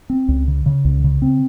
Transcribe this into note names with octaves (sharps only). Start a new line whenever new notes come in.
C4
C#2
C#3
C#3
C#2
C#3
C4